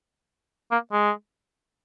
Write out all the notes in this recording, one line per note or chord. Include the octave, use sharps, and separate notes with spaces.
A#3
G#3